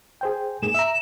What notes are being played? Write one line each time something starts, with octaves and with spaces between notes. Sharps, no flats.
G#4 C5 G5
G#2 A#3 G#4 E7
E5 A#5